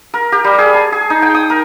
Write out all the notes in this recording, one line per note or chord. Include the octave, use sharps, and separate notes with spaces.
A#4
G4
G3
G#4
A5
G#4
D#4
G5
D#6
A#4